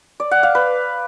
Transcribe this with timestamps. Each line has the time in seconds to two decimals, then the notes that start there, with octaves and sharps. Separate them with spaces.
0.20 D5
0.31 F#5
0.43 F5
0.55 B4